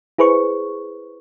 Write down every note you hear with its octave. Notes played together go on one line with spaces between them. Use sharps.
E4 G#4 B4 C5 C#6